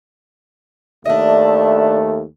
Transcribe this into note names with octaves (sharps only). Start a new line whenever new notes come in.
D#2 A3 D4 D#5 E5